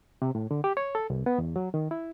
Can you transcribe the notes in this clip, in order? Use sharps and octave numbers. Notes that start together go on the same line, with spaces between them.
C3
A2
D3
G4
C#5
A4
C2
B3
E2
F#3
D#3
E4